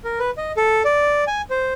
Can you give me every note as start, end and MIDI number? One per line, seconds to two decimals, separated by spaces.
0.04 0.19 70
0.20 0.30 71
0.37 0.52 75
0.57 0.83 69
0.85 1.24 74
1.27 1.42 80
1.50 1.74 72